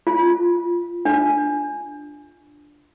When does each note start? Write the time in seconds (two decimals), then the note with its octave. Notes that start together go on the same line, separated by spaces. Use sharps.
0.07 F4
1.05 D4